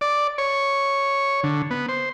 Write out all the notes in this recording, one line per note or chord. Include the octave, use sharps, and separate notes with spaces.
D5
C#5
D3
B3
C5